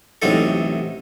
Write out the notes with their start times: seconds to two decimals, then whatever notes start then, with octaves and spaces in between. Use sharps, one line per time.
0.22 A1 C3 F#3 D#4 A4